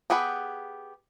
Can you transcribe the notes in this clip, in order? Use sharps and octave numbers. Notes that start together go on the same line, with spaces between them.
B3 G4 G#4 F#5 B5